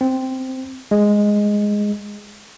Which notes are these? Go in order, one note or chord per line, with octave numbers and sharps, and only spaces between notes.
C4
G#3